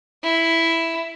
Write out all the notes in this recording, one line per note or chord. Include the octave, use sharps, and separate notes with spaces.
E4